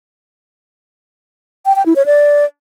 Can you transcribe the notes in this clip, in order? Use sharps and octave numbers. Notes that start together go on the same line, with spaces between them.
G5
G5
E4
C#5
D5